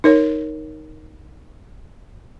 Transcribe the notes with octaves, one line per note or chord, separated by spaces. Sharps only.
D#4 A#4 C#5